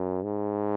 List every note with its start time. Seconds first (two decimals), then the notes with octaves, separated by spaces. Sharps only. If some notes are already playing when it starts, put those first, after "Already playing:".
Already playing: F#2
0.23 G#2